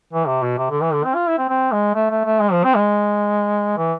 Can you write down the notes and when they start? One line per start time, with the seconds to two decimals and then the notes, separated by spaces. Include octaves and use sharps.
0.13 E3
0.27 C3
0.43 B2
0.58 C3
0.70 D3
0.82 E3
0.93 D3
1.04 C4
1.15 F4
1.27 E4
1.38 C4
1.49 C4
1.72 G#3
1.95 A3
2.10 A3
2.25 A3
2.40 G#3
2.52 F3
2.64 C4
2.75 G#3
3.77 E3